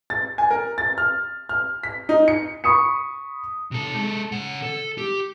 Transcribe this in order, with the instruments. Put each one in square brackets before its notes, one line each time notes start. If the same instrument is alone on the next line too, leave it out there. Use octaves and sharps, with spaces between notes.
[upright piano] A6
G#5
A#4
A6
F6
F6
B6
D#4
C#7
B5 C#6 D#6 C#7
[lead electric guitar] C3 A4
G#3 A4
C#3 F#5
A4
G4